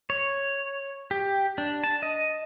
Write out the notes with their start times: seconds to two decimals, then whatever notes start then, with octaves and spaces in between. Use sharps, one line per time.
0.10 C#5
1.11 G4
1.58 D4
1.84 A5
2.03 D#5